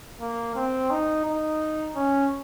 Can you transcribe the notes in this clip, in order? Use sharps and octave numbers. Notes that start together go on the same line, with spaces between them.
A#3
C4
D#4
D#4
C#4